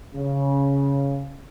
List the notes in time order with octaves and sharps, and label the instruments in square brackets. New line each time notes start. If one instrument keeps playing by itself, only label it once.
[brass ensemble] C#3